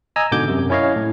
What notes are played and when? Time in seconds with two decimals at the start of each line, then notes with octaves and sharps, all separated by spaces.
0.16 D#5 G#5 A#5 E6
0.31 G#2 B2 D3 D6 G6
0.48 F#2 C3
0.70 C#4 E4 C#5 D#5 F5
0.96 A2